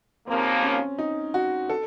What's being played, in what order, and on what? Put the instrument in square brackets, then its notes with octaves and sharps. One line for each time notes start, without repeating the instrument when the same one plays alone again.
[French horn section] D#2 C#3 F3 A#3 [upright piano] C4
[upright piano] C#4
D#4
F#4
A4